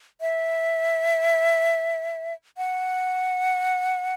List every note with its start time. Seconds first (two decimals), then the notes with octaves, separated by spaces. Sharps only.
0.21 E5
2.57 F#5